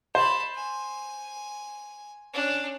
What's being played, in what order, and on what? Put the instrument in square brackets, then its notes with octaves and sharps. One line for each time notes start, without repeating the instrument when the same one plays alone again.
[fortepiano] C5 [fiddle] A5 B5
[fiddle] G#5
C#4 D4